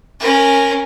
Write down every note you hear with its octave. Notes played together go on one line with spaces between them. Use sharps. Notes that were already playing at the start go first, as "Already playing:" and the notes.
C#4 A#4